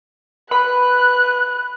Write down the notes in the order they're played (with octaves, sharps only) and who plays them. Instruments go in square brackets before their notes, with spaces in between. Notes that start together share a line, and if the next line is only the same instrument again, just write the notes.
[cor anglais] B4 [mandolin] B5 [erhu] F#6